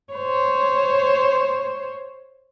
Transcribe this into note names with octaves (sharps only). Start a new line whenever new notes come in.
C5 C#5